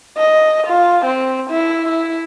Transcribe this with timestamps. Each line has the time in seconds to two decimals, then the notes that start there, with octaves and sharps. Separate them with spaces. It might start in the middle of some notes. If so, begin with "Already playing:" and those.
0.17 D#5
0.67 F4
1.05 C4
1.50 E4
1.88 E4